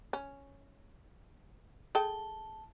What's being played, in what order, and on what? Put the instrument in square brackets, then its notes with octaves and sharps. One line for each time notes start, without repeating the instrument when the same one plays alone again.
[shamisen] C#4
[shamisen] G#4 A4 G5 [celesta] A5 G7